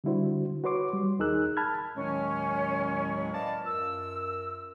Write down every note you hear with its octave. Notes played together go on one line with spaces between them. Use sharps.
D3 G3 D4 E4 F#4 C5
F#4 B4 C#5 C6 D6
G3
D#2 D#4 G#4 A#4 E6 F#6
A5 B5 F6 G#6
D#2 A2 D#3 F#3 G#3 C#4
B4 D5 D#5 F5 A5
F#2 F4 A#4 E6